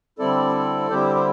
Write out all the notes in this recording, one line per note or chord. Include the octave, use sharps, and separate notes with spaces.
D3 G3 C4 E4 A4 D5
D3 G3 C4 E4 G4 C5
C5